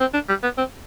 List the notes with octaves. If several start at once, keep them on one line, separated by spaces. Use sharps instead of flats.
C4
D4
G3
B3
C4